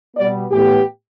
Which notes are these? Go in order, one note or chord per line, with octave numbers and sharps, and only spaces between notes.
B2 G3 B3 D5
A2 E3 B3 G4